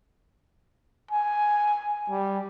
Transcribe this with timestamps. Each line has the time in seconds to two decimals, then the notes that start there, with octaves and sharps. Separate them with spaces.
1.11 G#5
2.10 G3